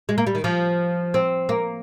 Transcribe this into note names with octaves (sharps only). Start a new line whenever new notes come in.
G#3
A#3
G3
D#3
F3
C4
A#3